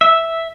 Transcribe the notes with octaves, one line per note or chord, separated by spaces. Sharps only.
E5